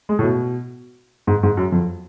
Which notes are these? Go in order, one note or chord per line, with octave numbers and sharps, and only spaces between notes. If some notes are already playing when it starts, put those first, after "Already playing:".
G#3
A2
B2
G#2
G#2
F#2
F2